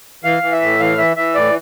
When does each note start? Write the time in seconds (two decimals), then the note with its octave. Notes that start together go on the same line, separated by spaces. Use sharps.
0.24 E3 F5
0.43 E3
0.52 E5
0.62 A2
0.80 E3 F5
0.98 E3 E5
1.17 E3 E5
1.35 A2 D5